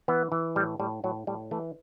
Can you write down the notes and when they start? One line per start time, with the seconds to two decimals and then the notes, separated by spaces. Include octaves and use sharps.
0.08 E3 B3
0.32 E3
0.56 A2 G3
0.80 A2 G3
1.04 A2 F#3
1.27 A2 G3
1.51 E3 A3